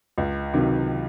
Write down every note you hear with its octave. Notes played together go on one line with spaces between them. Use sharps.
C#2
C3 D#3 F#3